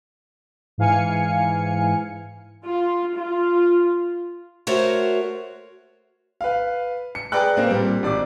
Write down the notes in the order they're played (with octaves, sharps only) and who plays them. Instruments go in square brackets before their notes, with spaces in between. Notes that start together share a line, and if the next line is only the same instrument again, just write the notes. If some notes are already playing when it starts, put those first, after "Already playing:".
[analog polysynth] G#2 E3 F5 G#5 C#7
[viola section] F4
F4
[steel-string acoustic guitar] A3 F#4 A#4 C5 C#5 F#5
[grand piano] B4 F5
C#7
G#4 B4 D5 G5 A#5 F#6
A#3 C4 B4
A#2 G3
G#1 D5 D6